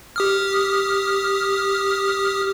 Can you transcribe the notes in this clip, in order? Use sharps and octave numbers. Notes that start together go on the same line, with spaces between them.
G4 D#6 F6